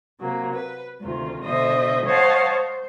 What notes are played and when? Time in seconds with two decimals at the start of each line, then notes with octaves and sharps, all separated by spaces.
0.19 C3 F#3 A#3
0.54 B4
1.01 D2 C3 D#3 F4
1.44 B2 D3 C5 D#5 E5 D#6
2.05 C5 C#5 D#5 F5 F#5 A5
2.48 C5